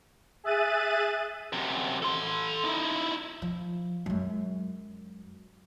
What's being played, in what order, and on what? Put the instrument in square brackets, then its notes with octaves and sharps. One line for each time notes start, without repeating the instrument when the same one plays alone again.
[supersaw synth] G#4 E5 F#6 A6 D#7
[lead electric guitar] F#2 C3
A4 C6
D#4 E4
[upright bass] F3
F#2 G#3